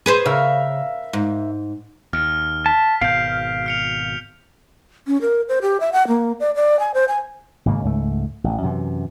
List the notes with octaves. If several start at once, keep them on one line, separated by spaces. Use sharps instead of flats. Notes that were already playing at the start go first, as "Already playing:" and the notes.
G#4 B4 C5
C#3 A#4 E5 F5
G#2
D#2 F6
A5 B6
G#1 B2 F5 G6 D7
F6 C#7 F7
C#4
A#4
C5
G4
E5
F#5
A#3
D5
D5
G#5
C5
G#5
G#1 G#2 C#3 A#3
C#2 G#2 A3
A1
F#2 C3 E3